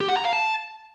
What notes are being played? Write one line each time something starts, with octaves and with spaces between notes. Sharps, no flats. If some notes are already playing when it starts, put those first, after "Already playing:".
G4
F#5
A#5
F5
A5